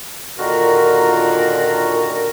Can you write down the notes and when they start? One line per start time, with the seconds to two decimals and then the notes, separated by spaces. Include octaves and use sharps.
0.38 A#2 D3 D#3 F4 F#4 A#4